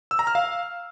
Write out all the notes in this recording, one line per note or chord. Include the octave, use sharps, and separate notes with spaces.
E6
A#5
F6
F5